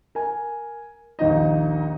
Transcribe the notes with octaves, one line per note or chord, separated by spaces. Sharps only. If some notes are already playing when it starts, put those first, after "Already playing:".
A#4 G#5
A#1 D#2 D#4 D#5